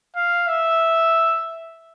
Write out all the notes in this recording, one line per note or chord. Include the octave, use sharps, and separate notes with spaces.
F5
E5